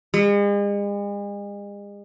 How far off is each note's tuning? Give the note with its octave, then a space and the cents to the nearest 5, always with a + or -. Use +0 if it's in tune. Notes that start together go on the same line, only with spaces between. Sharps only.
G#3 -40